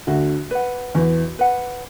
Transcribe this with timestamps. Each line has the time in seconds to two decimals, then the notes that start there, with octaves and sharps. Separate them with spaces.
0.07 D2 D3 F#4
0.51 B4 F#5
0.95 E2 E3 F#4
1.39 B4 F#5